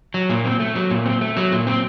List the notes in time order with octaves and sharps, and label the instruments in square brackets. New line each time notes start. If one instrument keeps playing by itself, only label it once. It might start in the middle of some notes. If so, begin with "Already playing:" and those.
[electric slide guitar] F#3
A#2
C4
A3
F#3
A#2
C4
A3
F#3
A#2
C4